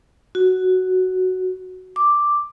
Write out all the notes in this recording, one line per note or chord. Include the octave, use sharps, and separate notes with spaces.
F#4
D6